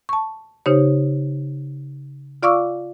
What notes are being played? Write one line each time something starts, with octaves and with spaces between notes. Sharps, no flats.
A5 C#6
C#3 D#4 G4 C5 C#5
F4 D5 F5 C#6 D6 E6